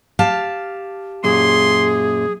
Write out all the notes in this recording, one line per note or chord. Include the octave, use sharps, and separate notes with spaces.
G4 F5 A5
F#2 A#2 G#4 C6